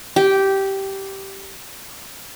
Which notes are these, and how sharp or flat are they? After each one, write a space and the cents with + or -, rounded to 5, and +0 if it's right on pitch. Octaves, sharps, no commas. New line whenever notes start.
G4 -10